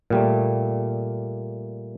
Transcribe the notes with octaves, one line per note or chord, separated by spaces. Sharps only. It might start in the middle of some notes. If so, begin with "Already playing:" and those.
A#2 G3 A3